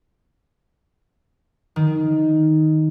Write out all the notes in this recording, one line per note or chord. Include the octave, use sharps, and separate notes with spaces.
D#3